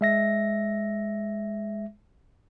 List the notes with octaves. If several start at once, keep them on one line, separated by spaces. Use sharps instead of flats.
G#3 E5 A#6